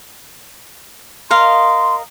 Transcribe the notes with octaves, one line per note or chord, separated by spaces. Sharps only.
A#4 D#5 F5 C6